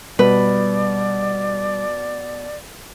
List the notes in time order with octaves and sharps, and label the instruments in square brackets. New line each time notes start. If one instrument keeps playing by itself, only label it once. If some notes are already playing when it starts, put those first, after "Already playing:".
[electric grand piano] B2 [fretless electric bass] G3 [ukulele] B4 [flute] D5